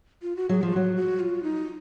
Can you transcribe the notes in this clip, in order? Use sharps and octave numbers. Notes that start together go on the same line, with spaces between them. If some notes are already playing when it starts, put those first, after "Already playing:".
F4
F#4
F#3 G#4
F3 F4
F#3 F#4
F#4
F4
D#4